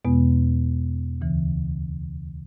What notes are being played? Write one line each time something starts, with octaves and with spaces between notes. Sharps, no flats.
E2 B2 G#3 B3
D2 C#3 E3